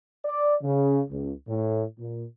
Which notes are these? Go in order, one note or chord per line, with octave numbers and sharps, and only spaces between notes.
D5
C#3
C#2
A2
A#2